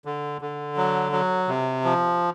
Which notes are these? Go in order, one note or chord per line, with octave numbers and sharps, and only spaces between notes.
D3
D3
F#3
F#3
C3
F3